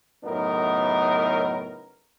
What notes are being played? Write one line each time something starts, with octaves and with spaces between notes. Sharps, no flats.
F#2 A2 C#3 B3 D#4 A#4